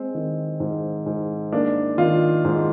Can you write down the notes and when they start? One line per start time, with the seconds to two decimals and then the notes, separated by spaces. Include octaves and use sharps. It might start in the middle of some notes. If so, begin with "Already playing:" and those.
Already playing: G#3 C4
0.15 D#3
0.60 G#2
1.06 G#2
1.52 A#3 D4
1.98 D#3 F4
2.45 G#2